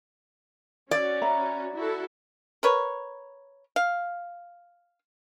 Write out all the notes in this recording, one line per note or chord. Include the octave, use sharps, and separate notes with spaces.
C#4 F#4 D5
E5 A#5 B5
E4 F#4 A4
A#4 B4 C#5
F5